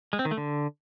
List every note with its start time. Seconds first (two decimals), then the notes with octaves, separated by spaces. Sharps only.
0.13 G#3
0.19 C4
0.25 D#3
0.31 A3
0.37 D3